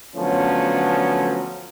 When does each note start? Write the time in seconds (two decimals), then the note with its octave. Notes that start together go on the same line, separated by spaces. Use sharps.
0.16 D3 F3 F#3 A3 B3 C#4